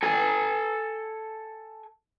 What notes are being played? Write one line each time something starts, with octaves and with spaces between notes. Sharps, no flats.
A4 G#5